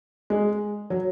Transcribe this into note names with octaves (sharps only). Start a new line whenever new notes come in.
G#3
F#3